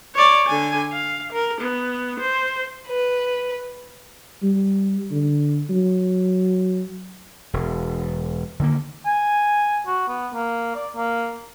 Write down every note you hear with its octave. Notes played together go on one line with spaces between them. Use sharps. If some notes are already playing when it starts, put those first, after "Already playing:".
C#5 D5
D3 G#5
F5
A#4
B3
C5
B4
G3
D3
F#3
E1
D3 D#3 G#3 A#3
G#5
F#4
B3
A#3
D5
A#3